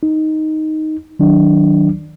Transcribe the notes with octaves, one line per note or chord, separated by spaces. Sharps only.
D#4
D#3 F#3 D4